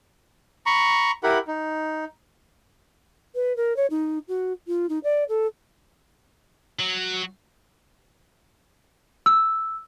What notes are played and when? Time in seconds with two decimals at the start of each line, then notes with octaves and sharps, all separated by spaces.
0.66 A#5 B5 C#6
1.23 E4 G4 A#4 F#5 B5
1.48 D#4
3.35 B4
3.57 A#4
3.76 C#5
3.90 D#4
4.28 F#4
4.67 F4
4.89 D#4
5.04 D5
5.29 A4
6.79 F#3
9.26 E6